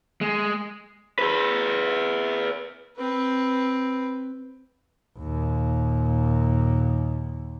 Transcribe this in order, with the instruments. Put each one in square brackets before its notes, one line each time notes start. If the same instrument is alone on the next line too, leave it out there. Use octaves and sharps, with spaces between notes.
[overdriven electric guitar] G#3
[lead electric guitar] G#4 B4
[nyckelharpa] C4 B4
[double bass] D#2 A#2